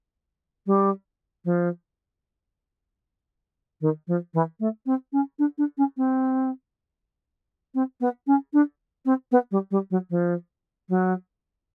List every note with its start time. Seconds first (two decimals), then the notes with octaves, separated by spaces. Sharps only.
0.66 G3
1.45 F3
3.81 D#3
4.07 F3
4.33 E3
4.59 A3
4.86 C4
5.12 C#4
5.38 D4
5.58 D4
5.77 C#4
5.97 C4
7.74 C4
8.00 B3
8.26 C#4
8.53 D4
9.05 C4
9.31 B3
9.51 G3
9.71 G3
9.90 F#3
10.10 F3
10.89 F#3